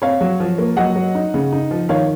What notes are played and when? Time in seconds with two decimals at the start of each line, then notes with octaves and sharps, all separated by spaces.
0.02 C4 C#5 F5
0.21 F#3
0.40 F3
0.58 A#3
0.76 F#3 D#5 F#5
0.96 F#3
1.15 D#4
1.34 C#3
1.53 D#4
1.71 F3
1.89 D#3 C#5 F5